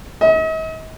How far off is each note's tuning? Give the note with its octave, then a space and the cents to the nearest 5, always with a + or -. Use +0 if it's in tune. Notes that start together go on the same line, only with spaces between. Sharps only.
D#5 +45